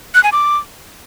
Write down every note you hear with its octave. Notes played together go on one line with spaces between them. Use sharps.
F#6
G#5
D6